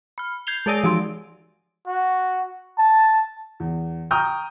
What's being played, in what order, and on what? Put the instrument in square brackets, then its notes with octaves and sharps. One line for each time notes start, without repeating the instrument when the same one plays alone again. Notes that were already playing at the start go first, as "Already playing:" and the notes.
[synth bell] B5 F6
G6 G#6 C7 F7 G7
G#3 G#4 C#5 D5 G#5 D7
E3 F3 D#4 C6 D7
[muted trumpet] F#4
A5
[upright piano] E2
G5 A#5 C#6 D#6 F6 G6